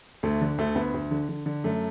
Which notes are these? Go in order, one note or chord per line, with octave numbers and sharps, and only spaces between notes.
D2 A3
D3
D2 A3
D2 B3
D2
D3
D3
D3
F#2 A3